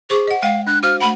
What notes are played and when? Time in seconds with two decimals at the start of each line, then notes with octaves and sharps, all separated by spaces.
0.10 G#4 C5 C#6 D6
0.27 D#5 F#5
0.43 G#3 F5 G5
0.67 D4 F#6
0.83 F#4 C5 F5 F6
1.00 A3 F#5 B5